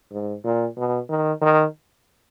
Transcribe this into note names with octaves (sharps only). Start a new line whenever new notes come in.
G#2
A#2
B2
D#3
D#3